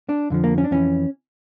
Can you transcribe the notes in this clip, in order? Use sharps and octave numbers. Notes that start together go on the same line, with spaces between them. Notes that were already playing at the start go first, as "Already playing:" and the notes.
D4
F2 D3 F3
A#3
C#4
D4
F2 E3 C#4